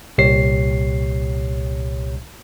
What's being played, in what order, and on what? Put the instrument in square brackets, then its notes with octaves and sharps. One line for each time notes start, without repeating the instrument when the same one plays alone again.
[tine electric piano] C2 A#2 G4 C#5 C7